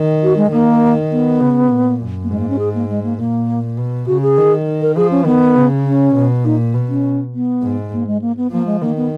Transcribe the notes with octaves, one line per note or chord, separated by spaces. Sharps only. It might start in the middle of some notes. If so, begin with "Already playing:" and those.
Already playing: D#3
F#4
G#3
D#3 A#3
B3
C#3
A#2
F#2
A#3
G#2 G#3
A#3
C#4
G#4
A#3
G#3
A#3
A#2 A#3
B2
C#3 F#4
G#4
D#3
A#4
F3 G#4
C#4
D#3 B3
C#3
C#4
B2
A#2 D#4
B2
C#4
B3
G#2
A#3
G#3
A#3
B3
F3 A#3
G#3
D#3 A#3
B3